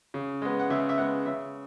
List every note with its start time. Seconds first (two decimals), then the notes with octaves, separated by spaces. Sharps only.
0.14 C#3
0.42 G#3 B3
0.59 F#5
0.70 C#3 E5
0.89 E5
0.98 G#3 B3 F#5
1.26 C#3 E5